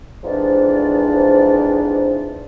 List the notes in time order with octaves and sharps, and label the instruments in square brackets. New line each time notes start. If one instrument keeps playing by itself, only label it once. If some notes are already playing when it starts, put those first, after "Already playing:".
[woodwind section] F2 G#2 E3 F3 D4 D5